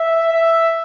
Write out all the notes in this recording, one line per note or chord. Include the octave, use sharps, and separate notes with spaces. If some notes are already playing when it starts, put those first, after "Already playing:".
Already playing: E5
E5